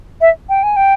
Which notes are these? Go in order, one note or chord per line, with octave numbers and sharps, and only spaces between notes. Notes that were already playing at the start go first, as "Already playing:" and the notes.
E5
G5
G#5
G5